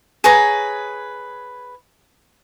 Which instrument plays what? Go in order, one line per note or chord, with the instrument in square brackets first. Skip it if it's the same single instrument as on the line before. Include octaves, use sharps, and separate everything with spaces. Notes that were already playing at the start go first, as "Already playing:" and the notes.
[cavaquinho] G#4 B4 C#5 A#5